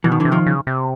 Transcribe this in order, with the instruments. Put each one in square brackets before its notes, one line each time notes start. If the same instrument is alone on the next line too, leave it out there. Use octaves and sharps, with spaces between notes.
[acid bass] B2 [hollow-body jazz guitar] E3
[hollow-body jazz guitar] D#3
D3 E3
[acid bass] C3
[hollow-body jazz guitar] D#3 F3
[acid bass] C#3
C3